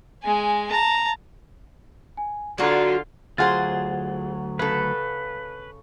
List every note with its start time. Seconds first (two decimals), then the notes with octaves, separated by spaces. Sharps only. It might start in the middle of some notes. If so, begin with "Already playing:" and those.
0.23 G#3 G#5
0.71 A5 A#5
2.17 G#5
2.58 D3 F#3 F4 F#4 D5 A#5 G#6
3.38 D2 F#3 F4 G#4 C5 F#5 A6
4.59 C#3 A4 B4